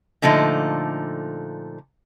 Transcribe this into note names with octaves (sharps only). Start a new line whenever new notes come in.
A#2 D3 F3 A3 D#4